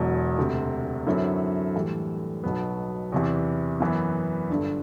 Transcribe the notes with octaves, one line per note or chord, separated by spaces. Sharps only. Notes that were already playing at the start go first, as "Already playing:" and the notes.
Already playing: E1 E2 B2 F#3
E1 D2 C3
F#2 D3 F#3 C4 E4
A2 E3 G3
B1 B2 F#3 B3
E2 C3 E3
F#2 E3 B3
G1 G2 D3